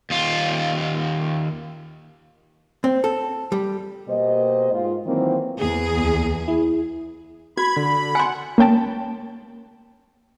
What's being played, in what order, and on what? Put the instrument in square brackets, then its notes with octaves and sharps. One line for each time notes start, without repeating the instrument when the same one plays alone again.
[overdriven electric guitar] D#2 F4
[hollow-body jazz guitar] C4
A4
G3
[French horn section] B2 A#3 G4 C5 D#5
G#2 F4
D#3 E3 F#3 A#3 C4
[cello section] E2 G#4
[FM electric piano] D2
E4 G#4
[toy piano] F#4 [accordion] B5 [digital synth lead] G#6
[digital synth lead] D3
[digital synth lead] F#5 [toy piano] G#5 C6
[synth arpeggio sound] A#3 C#4 G5 A5